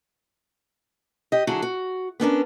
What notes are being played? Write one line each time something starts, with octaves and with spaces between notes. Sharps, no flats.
G4 D#5
D3 F#3 E4 F#4 G#4
F#4
B3 C#4 D4 A#4